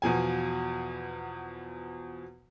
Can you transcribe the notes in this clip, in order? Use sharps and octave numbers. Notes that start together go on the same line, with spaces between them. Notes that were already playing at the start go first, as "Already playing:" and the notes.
E2 B2 F3 G#5